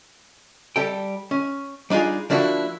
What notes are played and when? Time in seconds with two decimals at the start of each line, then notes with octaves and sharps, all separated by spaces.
0.76 G3 A4 G5
1.31 C#4
1.90 G3 D4 D#4 F4 G#4
2.30 F3 A#3 D4 E4 F#4